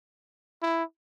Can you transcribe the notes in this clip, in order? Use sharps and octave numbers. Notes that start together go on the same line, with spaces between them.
E4